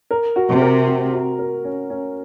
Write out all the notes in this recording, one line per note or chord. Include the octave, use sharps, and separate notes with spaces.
A#4
F#4
C3
A#4
F#4
F#4
A#4
C#4
C#4